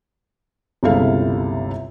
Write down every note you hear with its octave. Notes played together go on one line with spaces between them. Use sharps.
G1 C#2 C3 E4 A4 F5